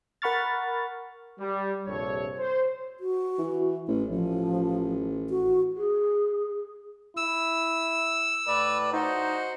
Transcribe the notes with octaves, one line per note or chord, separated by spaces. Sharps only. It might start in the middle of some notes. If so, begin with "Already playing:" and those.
A#4 F#5 B5 C#6 F6 A6
G3
A#1 G2 C3 A4 C#5
C5
F#4
E3
A1 A3
A1 F3
F#4
G#4
E4 E6
A2 B4 D5
D#4 F#4 C5